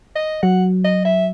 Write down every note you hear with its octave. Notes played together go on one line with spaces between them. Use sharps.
D#5
F#3 F#5
D#5
E5